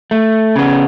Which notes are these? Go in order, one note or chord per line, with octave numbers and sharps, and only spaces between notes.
A3
C#3 B3